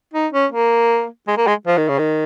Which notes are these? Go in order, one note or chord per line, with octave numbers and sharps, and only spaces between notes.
D#4
C#4
A#3
G#3
A#3
G#3
F3
D#3
C#3
D#3